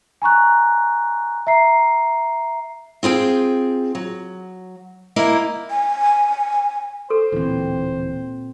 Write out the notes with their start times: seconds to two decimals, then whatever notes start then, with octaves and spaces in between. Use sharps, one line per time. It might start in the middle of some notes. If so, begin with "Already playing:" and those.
0.22 G#5 A#5 C#6 F#6
1.47 E5 A#5 C7
3.03 C4 F4 G#4 G5
3.95 F#3
5.16 A#3 E4 D#5
5.70 G#5
7.10 A4 C5
7.32 D1 A#2 E3 C4